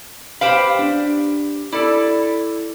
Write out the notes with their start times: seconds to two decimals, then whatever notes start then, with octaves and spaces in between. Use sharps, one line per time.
0.41 G4 B4 C5 F5 G5 B5
0.79 D4
1.72 E4 A4 D5